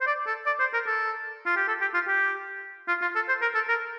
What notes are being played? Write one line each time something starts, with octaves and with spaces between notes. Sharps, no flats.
C5
D5
A4
D5
C5
A#4
A4
F4
G4
A4
G4
F4
G4
F4
F4
A4
C5
A#4
A4
A#4